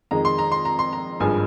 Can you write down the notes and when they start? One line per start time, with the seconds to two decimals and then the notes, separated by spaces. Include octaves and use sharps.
0.11 F2 D#3 G#3 A#5
0.25 C6
0.38 A#5
0.52 C6
0.65 A#5
0.79 C6
0.93 A#5
1.20 G#1 G2 F3 G#3 G#5